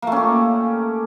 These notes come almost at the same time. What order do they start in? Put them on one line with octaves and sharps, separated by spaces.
A#3 A3 C#4 G4